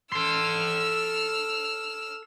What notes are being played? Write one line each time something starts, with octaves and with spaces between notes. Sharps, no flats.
A4 C6 E6 F6